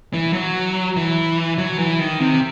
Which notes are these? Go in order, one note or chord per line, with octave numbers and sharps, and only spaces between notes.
E3
F#3
E3
F#3
E3
D#3
C3